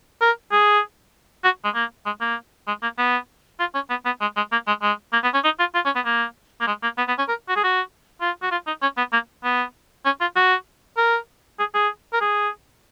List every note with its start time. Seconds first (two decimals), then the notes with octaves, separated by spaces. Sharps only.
0.21 A#4
0.52 G#4
1.44 F#4
1.64 G#3
1.75 A#3
2.06 G#3
2.21 A#3
2.67 G#3
2.82 A#3
2.98 B3
3.60 F4
3.75 C#4
3.90 B3
4.05 B3
4.21 G#3
4.36 G#3
4.52 A#3
4.67 G#3
4.82 G#3
5.13 A#3
5.24 B3
5.34 C#4
5.44 D#4
5.59 F4
5.75 F4
5.85 C#4
5.95 B3
6.05 A#3
6.61 A#3
6.67 G#3
6.83 A#3
6.98 B3
7.08 B3
7.18 C#4
7.29 A#4
7.49 F#4
7.56 G#4
7.64 F#4
8.21 F4
8.43 F#4
8.51 F4
8.67 D#4
8.82 C#4
8.98 B3
9.13 A#3
9.44 B3
10.05 C#4
10.21 F4
10.36 F#4
10.97 A#4
11.59 G#4
11.74 G#4
12.13 A#4
12.21 G#4